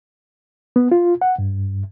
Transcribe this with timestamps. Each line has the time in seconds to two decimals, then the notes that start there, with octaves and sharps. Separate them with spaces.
0.76 B3
0.92 F4
1.21 F#5
1.39 G2